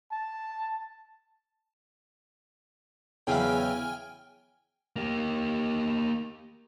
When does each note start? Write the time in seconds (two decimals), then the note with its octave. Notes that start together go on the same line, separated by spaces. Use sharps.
0.11 A5
3.27 E2 C#3 F#3 E4 G5 G#5 F6
4.96 A#3 G4